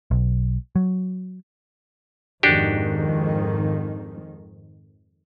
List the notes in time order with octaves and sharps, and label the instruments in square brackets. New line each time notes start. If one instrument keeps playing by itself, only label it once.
[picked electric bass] B1
F#3
[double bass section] F2 G#2 D#3 [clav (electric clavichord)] D4 F#4 G4